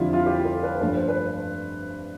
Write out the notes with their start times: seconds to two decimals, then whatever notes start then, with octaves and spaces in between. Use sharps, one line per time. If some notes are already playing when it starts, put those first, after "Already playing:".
Already playing: F2 D3 G3 E4 F4
0.13 F4
0.26 G4
0.44 A4
0.63 B4
0.81 G2 F3 A3 B4
0.95 C5
1.08 B4